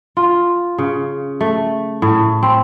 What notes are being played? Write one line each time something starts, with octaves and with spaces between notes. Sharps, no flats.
F4
C#3
A3
A2
C4